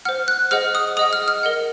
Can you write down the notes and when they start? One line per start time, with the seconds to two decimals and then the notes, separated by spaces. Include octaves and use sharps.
0.05 C5 F#5 F6
0.28 F#6
0.51 G#4 C5 D#5 F#5 F6
0.75 D#6
0.97 G#4 D#5 F#5 D#6
1.13 F6
1.28 F6
1.43 A#4 D#5 F#5